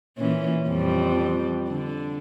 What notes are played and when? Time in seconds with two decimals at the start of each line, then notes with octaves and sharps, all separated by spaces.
0.18 A#2 E3 C#4
0.67 F2 G3
1.69 D3